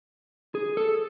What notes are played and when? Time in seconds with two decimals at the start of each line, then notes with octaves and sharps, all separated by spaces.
0.55 G#4
0.77 A4